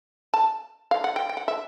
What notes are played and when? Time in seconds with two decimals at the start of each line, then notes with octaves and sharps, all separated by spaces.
0.34 A5
0.91 F5
1.04 F#5
1.16 G5
1.29 G5
1.37 F#5
1.48 E5